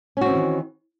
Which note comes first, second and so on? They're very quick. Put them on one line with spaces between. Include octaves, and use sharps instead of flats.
C#4 F#4 C4 E3 D#3